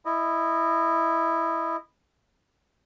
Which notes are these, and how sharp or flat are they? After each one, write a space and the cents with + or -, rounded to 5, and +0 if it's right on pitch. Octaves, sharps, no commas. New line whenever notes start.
E4 +0 D#5 -15